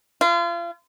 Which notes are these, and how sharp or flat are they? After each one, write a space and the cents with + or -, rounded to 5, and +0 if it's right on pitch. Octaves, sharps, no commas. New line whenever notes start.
F4 -35